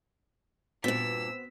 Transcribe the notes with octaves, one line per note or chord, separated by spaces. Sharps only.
G2 A#2 B3 C4 F#4 E6 B6